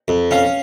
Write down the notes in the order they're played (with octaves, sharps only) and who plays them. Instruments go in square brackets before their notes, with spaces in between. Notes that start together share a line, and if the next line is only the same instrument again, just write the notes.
[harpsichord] F2
[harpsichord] C#4 [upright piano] F5